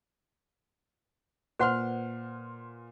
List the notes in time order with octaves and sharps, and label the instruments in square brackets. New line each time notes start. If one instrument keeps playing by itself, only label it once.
[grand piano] A#2 C6 F6 [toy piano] B4 C5 F#5